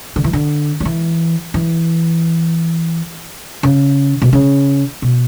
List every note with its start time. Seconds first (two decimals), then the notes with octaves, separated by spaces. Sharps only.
0.16 D3
0.24 E3
0.33 D3
0.80 F#3
0.85 E3
1.54 E3
3.63 C#3
4.22 B2
4.33 C#3
5.02 B2